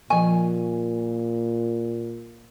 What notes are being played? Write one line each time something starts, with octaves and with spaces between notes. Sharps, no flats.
A#2 F3 G#5 C#6